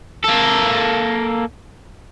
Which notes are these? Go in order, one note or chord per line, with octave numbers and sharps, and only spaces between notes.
A#3 A4